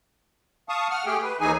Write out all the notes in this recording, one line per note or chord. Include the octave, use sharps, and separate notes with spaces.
F5 A5 C#6 D#6
F#5 F6
A3 G4 G#4 G5
B4
D#2 E3 D#4 G#4 G#5